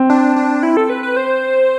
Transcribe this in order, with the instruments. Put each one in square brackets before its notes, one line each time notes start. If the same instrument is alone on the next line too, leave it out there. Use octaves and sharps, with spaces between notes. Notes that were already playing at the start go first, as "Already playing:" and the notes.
Already playing: [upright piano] C4
[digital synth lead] D4
D4
E4
A4
B4
B4
C5